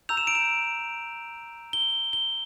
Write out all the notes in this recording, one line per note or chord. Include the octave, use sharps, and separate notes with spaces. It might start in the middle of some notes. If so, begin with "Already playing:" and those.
A#5 E6 G6 F7
E7
D7
E7
G7
G7